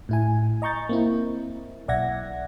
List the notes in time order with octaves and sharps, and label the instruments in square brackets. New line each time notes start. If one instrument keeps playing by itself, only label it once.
[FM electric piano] A2 E4 G#5
D#5 A#5 C#6 G6 A6
A#3 C4 E4
B1 D5 E5 F#5 G#6 A#6